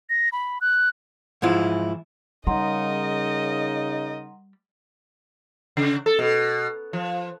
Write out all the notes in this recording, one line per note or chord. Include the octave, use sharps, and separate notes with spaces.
A#6
B5
F#6
G#2 E3 F3 E4 F4
C#3 G3 D#4 A#4 D#5 F#5 A#5 C6
C#3
A4
B2
F3